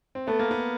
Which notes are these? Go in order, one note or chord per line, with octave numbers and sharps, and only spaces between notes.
C4
A3 B3
A#3
B3